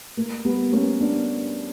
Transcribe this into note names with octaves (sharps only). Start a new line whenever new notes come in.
A#3
G3 B3
A#3 C#4
B3 D4